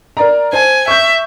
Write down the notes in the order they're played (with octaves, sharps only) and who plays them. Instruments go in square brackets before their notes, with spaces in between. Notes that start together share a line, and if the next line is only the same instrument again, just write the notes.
[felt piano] A#4 D5 A#5
[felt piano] C5 A5 [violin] G#5
[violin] E5 [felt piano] C#6 G6